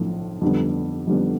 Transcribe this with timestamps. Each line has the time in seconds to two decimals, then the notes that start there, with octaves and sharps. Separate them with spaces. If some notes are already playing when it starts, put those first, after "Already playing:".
Already playing: B1 A2 F3
0.41 F2 D3 G3 B3
1.07 F2 D3 G3 B3